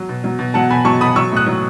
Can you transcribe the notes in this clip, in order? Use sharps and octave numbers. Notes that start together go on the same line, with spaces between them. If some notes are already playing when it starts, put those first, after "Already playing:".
Already playing: F#3
B2
F#3
B2
F#3 F#5 A5
B2 G#5 B5
F#3 A5 C#6
B2 B5 D#6
F#3 C#6 E6
A2 D#6 F#6
F#3